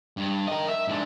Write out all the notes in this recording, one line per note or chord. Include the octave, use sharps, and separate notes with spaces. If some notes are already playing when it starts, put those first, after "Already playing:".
G2
A#4 D#5
E5
G#2 D4